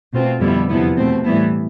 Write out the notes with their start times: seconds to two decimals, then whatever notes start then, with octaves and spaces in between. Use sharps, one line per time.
0.13 B2 A3 C4 F4
0.41 F2 D3 G3 B3 E4
0.69 E2 C3 F3 B3 E4
0.97 B2 A3 C4
1.25 A2 E3 G3 B3 E4